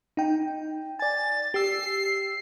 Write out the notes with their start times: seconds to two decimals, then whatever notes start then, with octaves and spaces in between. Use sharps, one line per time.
0.17 D#4 G5
0.99 D5 G#5 A6
1.54 G4 E6 C7